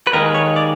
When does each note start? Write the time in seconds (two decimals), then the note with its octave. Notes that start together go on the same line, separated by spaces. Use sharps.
0.07 B4
0.13 D#2 D#3 G#3 A#4
0.35 C#5
0.56 D5